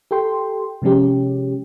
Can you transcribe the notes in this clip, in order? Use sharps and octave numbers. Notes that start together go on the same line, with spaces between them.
G4 A4 G5 C6
C3 F3 G#3 C#4 G4